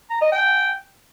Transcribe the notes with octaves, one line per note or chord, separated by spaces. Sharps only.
A#5
D#5
G5